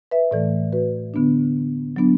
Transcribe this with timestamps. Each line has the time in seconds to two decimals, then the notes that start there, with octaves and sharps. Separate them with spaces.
0.11 B4 E5
0.31 A2 E3 A3 A4 D5
0.72 F#4 B4
1.14 D3 B3 D4
1.96 F#3 B3 D4